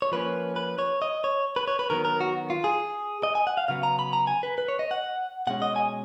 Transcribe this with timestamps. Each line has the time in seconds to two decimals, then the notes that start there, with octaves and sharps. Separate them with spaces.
0.02 C#5
0.12 F3 A#3 C#4 B4
0.56 B4
0.79 C#5
1.02 D#5
1.24 C#5
1.56 B4
1.68 C#5
1.79 B4
1.90 D#3 F#3 B3 A#4
2.05 A#4
2.21 F#4
2.50 F4
2.64 G#4
3.23 D#5
3.35 G#5
3.47 F#5
3.57 F5
3.68 C#3 F#3 B3 F5
3.83 A#5
3.99 B5
4.13 A#5
4.27 G#5
4.43 B4
4.58 B4
4.68 C#5
4.79 D#5
4.91 F#5
5.47 B2 G#3 C#4 F#5
5.62 D#5
5.76 G#5